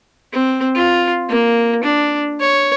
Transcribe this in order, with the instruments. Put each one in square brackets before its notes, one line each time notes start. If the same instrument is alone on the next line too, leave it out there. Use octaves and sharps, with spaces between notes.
[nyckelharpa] C4
F4
A#3
D4
C#5